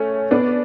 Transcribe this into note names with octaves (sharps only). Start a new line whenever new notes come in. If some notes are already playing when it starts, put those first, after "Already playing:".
Already playing: A3 C#4
B3 D4